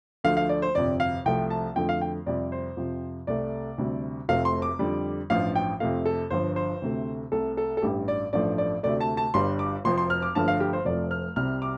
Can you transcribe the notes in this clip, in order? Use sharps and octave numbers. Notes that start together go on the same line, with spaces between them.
D2 D3 F3 A3 F5
F5
D5
C5
G1 F2 C3 D5
F5
C2 C3 F3 A3 G5
A5
F2 D3 F3 A3 G5
F5
G5
F2 C3 G3 D5
C5
F2 C3 F3
C2 C3 A3 D5
D2 C3 G3
F1 F2 C3 A3 F5
C6
D6
F2 D3 G3
A1 G2 F3 F5
G5
F2 C3 A3 F5
A4
G1 G2 F3 C5
C5
D2 C3 A3
C2 C3 A3 A4
A4
A4
A1 G2 G3 G4
D5
A1 G2 F3 A3 D5
D5
D2 C3 A3 D5
A5
A5
G1 G2 G3 C6
D6
F1 F2 F3 C6
C6
F6
D6
G1 G2 F3 A3 A5
F5
G4
C5
F1 F2 F3 A3 D5
F6
C2 C3 G3 F6
D6